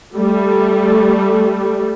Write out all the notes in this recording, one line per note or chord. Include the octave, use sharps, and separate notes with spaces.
G3 A3